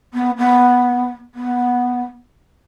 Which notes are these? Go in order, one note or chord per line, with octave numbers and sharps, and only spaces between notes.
B3
B3
B3